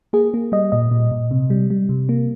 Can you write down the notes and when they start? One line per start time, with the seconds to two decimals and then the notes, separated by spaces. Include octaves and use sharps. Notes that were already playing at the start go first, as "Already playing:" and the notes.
0.13 A#3 G#4
0.34 A#3
0.52 G3 D#5
0.72 A#2 D#5
0.91 A#2
1.11 A#2
1.31 C3
1.50 G3
1.70 G3
1.89 C3
2.09 A#3